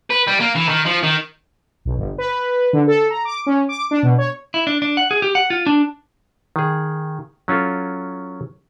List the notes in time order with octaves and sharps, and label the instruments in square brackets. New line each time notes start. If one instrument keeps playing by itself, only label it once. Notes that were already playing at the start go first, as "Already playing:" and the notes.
[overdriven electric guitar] B4
G3
A#3
E3
D#3
F3
D#3
[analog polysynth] B1
G1
B4
D3
A4
A#5
D6
C#4
D6
D4
B2
C#5
[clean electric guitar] E4
D4
D4
F#5
G#4
G4
F#5
F4
D4
[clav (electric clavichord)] D#3 G#4
F#3 C#4 F4 A4